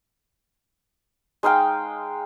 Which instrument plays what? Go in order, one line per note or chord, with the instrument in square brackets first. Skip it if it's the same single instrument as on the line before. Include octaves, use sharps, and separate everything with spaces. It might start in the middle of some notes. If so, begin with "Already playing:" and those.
[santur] G#3 D#4 F5 G5